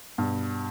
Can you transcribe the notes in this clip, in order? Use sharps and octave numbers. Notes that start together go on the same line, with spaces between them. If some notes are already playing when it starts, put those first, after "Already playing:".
G2 B2